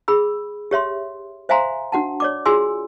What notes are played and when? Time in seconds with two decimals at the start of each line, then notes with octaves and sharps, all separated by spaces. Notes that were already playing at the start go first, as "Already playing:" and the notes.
0.08 G#4 B5 E6
0.71 G4 C#5 E5 C6
1.49 C5 E5 F5 G#5 A#5 C6
1.92 D4 F#4 F#5 A5
2.20 C#5 D5 D6
2.46 F4 F#4 G#4 G#5 C6 E6